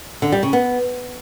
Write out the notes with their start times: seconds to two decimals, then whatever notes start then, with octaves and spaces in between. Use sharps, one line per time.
0.22 D3
0.32 G3
0.43 C#3
0.53 B3